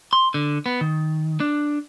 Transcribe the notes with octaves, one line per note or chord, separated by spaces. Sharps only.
C6
D3
B3
D#3
D4